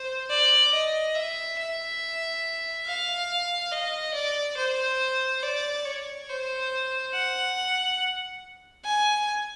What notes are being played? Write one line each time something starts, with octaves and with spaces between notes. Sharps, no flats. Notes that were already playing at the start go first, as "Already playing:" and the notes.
Already playing: C5
D5
D#5
E5
E5
F5
D#5
D5
C5
D5
C#5
C5
F#5
G#5